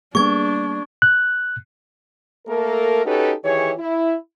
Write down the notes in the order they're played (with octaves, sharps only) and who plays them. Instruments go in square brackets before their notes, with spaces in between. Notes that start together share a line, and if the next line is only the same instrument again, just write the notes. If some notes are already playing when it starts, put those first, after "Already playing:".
[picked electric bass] G3 A#3 B3 [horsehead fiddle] D4 [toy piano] G#4 [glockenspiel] C#6 G#6
[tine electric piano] F#6
[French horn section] A3 A#3 A4 A#4
C#4 D#4 F#4 G4 A4 B4
D#3 E3 G4 G#4 C#5
E4